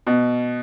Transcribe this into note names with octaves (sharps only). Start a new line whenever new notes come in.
B2